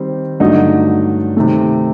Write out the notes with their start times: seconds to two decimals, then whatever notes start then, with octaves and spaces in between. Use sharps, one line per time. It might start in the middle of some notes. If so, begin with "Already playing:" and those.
Already playing: D#3 G3 C4
0.40 G2 D3 F#3 A3 D#4
1.37 C3 D#3 A3